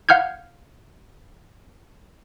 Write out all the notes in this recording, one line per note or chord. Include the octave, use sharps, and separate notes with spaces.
F5 F#5 F6 G6 G#6